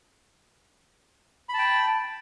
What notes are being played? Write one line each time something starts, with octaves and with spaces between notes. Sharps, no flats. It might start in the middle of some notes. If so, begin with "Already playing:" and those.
G5 A5 B5